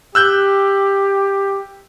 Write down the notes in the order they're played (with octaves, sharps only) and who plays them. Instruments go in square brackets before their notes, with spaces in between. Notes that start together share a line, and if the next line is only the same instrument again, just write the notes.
[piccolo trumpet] G4 [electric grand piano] E6 F#6 G6